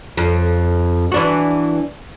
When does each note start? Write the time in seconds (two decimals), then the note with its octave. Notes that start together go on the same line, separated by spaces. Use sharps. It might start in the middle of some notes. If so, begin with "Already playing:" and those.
0.17 F2
1.12 E3 D4 F#4